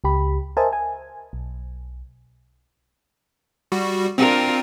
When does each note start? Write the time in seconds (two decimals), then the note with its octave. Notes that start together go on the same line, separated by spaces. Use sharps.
0.04 C#2 G4 B5
0.57 A#4 C5 D#5 E5 G#5 A5
0.73 G#5
1.33 B1
3.72 G3 F#4
4.18 C4 D4 F4 A#4